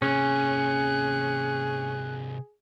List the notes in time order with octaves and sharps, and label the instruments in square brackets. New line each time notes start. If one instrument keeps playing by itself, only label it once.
[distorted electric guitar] C3 A#3 [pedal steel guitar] C#4 [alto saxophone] G#4 [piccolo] F#6